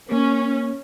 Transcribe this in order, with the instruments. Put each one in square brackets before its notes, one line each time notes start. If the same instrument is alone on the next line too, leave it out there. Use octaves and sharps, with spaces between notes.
[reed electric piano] A#3 [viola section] C#4